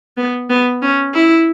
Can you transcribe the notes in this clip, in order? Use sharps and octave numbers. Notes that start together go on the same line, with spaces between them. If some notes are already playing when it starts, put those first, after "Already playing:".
B3
B3
C#4
E4